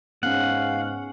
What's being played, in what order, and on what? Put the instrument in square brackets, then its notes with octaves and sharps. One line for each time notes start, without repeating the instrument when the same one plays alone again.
[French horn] G#2 [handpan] B3 C#4 [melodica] F5 [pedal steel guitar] F#5